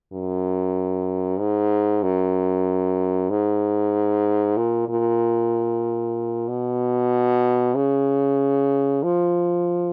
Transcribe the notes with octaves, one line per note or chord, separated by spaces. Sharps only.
F#2
G#2
F#2
G#2
A#2
A#2
B2
C#3
F3